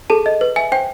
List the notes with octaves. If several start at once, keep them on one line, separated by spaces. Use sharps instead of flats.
G#4 A4 A5
D#5
B4
E5 G#5
C5 G5